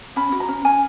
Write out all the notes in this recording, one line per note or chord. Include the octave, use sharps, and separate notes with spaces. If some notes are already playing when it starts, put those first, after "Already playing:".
C#4 B5
F#4
A#5
C#4
C#4 G#5